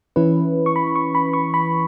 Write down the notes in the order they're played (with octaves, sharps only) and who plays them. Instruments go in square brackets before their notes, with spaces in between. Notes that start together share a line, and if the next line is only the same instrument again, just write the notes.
[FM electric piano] E3 C#4 E4 B4
C#6
B5
C#6
B5
C#6
B5